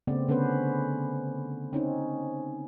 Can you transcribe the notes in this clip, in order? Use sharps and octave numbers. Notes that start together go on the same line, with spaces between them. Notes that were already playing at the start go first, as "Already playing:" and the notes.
C#3 A3 B3 C4 D5
D3 B3 C#4 B4 C5
C4 C#4 D#4